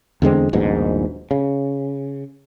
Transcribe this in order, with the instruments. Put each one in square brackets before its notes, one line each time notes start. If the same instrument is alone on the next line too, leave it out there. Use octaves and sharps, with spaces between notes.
[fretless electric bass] E2 D3 G#3 C4
D#1 A#1 G#2 B2
C#3